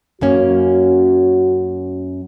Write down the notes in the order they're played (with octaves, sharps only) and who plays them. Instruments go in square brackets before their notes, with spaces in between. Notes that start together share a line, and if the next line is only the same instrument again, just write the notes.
[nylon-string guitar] F#2 A#3 C#4 [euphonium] F#4